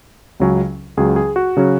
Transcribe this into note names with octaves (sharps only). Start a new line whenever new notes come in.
C#2 C#3 F#3 C#4
C#2 C#3 F#3 C#4 G#4
G#4
F#4
C#3 F#3 C#4